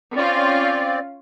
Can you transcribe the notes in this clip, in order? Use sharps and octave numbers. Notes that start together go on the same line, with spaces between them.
C4 C#4 F4 D5 F5